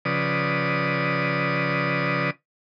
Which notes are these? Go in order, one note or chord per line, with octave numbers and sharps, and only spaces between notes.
C#3 F3 B4 D5 D#6